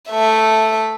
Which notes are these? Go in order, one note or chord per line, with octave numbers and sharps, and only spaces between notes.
A3 E5